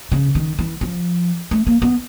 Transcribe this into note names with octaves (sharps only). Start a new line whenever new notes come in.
C#3
D#3
E3
F3
A3
A#3
B3